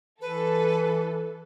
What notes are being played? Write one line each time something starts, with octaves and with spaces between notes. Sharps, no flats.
E3 A4 B4